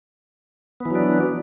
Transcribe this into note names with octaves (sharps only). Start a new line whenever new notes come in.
E3 F#3 B3 D4